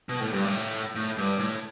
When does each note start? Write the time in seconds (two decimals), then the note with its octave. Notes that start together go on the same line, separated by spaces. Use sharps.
0.09 B2
0.20 A2
0.33 G2
0.45 A2
0.95 A2
1.18 G2
1.39 A2